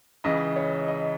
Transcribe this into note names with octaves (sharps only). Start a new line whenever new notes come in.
C#2 C#3 E3 D#5
C#5
D#5